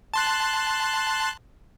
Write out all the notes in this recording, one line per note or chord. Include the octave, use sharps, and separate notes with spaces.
A5 C6 F#6